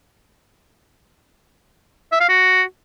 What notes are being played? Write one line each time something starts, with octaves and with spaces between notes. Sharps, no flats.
E5
F5
F#4